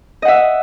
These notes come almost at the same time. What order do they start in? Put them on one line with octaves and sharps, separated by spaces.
D#5 F#5 E5